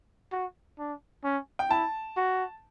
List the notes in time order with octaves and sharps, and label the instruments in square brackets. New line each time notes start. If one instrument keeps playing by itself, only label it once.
[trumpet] F#4
D4
C#4
[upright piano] G5
[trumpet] E4 [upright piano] A5
[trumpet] F#4